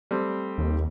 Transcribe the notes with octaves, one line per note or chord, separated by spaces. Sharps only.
G3 A3 C4
D#2